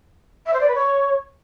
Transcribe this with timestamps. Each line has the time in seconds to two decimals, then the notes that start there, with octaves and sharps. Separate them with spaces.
0.46 E5
0.53 C5
0.60 D5
0.68 B4
0.75 C#5